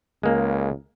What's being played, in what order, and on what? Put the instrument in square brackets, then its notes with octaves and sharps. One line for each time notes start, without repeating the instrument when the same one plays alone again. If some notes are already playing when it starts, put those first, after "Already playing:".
[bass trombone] C#2 [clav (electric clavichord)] G#3 A#3